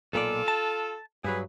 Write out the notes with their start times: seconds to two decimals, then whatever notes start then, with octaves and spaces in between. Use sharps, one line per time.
0.13 B1 A#2 F4 A4 D5
0.48 A5
1.24 G2 F#3 G#4 B4